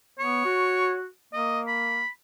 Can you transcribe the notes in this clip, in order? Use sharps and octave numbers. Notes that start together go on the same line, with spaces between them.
B3 C#5
F#4
A#3 D#5
B5